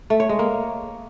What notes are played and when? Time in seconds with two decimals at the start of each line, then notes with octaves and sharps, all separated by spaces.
0.10 A3
0.20 C#5
0.29 G#3
0.39 A#3